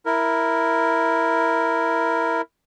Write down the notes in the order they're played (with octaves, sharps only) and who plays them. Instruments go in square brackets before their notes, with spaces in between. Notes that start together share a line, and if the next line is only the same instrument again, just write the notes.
[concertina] E4 A#4